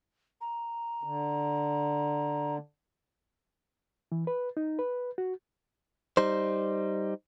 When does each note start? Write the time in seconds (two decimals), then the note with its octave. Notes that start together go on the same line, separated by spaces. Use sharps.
0.41 A#5
1.03 D3
4.12 E3
4.27 B4
4.57 D#4
4.79 B4
5.18 F#4
6.17 G3 D#4 C5